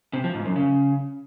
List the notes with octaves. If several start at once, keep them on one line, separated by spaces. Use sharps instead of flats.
C3
F3
G#2
F#2
C#3